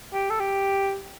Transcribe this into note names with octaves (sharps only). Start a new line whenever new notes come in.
G4
A4
G4